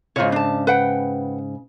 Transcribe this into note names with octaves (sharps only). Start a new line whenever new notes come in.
G#2 C#3 F4 C#5
D4 A5
B4 F#5 G5